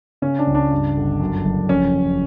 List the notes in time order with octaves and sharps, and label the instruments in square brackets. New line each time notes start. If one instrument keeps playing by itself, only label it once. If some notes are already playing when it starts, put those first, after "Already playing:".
[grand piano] C#3 C#4
D4
C#2
D4
G2
G1
F#2
F#1
F2 C#4